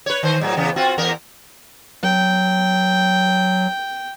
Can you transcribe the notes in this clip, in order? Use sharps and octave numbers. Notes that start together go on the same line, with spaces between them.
B4 C#5
D#3 C5
A2 F#3 G#3
E2 C#3 B3
C4 F4 F#4
E2 B3 A#4
F#3 G5